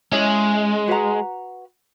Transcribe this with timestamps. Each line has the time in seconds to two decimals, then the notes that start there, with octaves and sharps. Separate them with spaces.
0.11 G#3 C#4 E4 G#4 D#5
0.88 F#4 B4 F#5 A#5